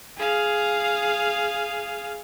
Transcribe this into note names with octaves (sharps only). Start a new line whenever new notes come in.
G#4 F5